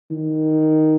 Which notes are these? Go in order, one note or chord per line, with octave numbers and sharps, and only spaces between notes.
D#3